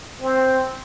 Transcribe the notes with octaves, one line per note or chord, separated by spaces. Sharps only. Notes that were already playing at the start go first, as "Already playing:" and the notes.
C4